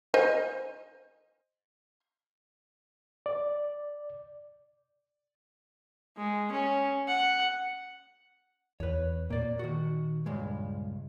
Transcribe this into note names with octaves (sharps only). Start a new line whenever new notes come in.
C5 D#5 G#5
D5
G#3
C#4
F#5
E2 B4 C#5
A#2 A#3 D5
D#3 F#4
C#2 G2 G#3